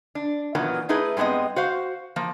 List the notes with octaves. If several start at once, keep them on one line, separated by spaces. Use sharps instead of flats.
D4
A#2 D#3 E3 F#3 A#3 B3
A3 D#4 E4 G#4 B4
G2 G#3 B3 C4 D#5
F#4 C5 F5
F3 A#3